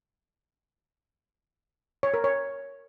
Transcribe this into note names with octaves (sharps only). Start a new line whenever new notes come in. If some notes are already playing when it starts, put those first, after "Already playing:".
C#5
A#4
C#5